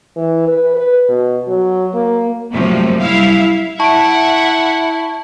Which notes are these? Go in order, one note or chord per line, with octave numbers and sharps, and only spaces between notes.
E3
B4
B4
B2
F#3
A#3
F#2 C3 F3 G3 A3 A#3
G3 E4 E5 F5
E4 E5 F#5 A5 C#6 D7